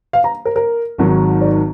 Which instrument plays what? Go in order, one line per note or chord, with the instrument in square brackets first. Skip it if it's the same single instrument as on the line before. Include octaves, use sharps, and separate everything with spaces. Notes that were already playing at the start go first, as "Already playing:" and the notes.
[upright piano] F5
A#5
A#4
A#4
[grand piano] G#1 G#2 D#3 F#3
[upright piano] D5